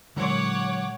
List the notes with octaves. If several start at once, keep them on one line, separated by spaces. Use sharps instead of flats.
A#2 D3 F#3 G#3 C#5 F#5 C6 D6